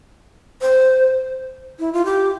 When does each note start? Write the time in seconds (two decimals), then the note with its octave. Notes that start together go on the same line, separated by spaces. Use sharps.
0.62 C5
1.79 E4
1.93 F4
2.05 G4